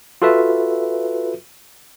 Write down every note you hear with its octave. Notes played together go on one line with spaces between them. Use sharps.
F4 F#4 A4 B4 E5